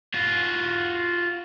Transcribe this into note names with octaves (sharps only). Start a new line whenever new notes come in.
F4 F#4